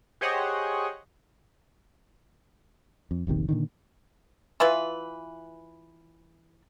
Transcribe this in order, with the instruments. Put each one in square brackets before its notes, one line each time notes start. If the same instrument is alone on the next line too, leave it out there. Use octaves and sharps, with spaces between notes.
[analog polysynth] G4 G#4 C5 C#5 D#5 F#5
[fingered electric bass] F2
E1 A#1 C3 D#3
A#2 D3 D#3
[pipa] E3 E4 F4 B4